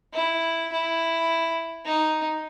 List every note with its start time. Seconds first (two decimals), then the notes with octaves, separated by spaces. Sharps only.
0.14 E4
0.72 E4
1.85 D#4